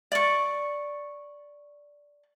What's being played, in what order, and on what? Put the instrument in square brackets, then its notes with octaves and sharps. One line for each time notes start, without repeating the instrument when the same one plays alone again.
[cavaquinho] D5 C#6